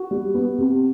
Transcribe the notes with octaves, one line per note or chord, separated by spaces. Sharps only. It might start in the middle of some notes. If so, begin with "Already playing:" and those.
Already playing: F#4
G3
B3
C3